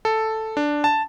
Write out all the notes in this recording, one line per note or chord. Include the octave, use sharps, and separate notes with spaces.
A4
D4
A5